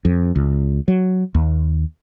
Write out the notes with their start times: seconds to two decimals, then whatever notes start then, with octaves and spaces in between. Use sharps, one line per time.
0.05 F2
0.36 C#2
0.88 F#3
1.35 D#2